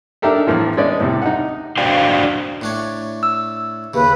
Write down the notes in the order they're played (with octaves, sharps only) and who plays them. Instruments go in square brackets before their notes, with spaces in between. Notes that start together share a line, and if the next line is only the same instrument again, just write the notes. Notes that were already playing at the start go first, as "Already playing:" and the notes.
[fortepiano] D4 D#4 G4 A4 A#4 E5
E2 A2 E3 F3
G#3 C#4 B4 D5 D#5
A2 C3 G3
D#4 F#5
[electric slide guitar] D4 F#4 C5 D5 F5 G5
[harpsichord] A2 D4 C#5
[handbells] E6
[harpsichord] D#2 C#3 [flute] B4